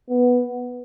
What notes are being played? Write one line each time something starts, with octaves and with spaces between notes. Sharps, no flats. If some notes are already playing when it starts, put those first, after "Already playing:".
B3